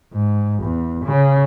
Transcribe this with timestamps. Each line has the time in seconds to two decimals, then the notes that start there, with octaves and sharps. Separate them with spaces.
0.13 G#2
0.63 E2
1.05 C#3